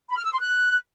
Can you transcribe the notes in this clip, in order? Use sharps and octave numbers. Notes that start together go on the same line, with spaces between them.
B5
F6
E6
C6
F#6